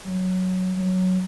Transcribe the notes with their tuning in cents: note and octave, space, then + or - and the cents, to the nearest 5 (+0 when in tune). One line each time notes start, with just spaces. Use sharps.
F#3 +0
F#3 +0